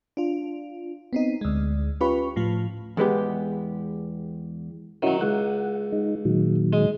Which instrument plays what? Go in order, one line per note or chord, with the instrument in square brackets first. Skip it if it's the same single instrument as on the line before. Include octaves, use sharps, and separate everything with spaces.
[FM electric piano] D4 F4
B3 C4 D#4
D2 G#3
C#4 F4 G4 B4 B5 C#6
A2 F3 F4
[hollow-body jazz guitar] E2 G#3 B3 G4
[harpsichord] D#3 F#3 [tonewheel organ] C#4 E4 F#4
[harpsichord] C#2 [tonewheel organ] F#5
[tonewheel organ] G#3 D#4
A#2 D#3 F#3
[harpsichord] G#3